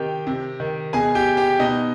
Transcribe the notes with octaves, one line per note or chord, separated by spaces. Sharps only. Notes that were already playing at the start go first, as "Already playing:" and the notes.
Already playing: C3 D#3 G4 G5
C3
D#3
B2 G#4 G#5
G4 G5
G4 G5
B2 D#4 D#5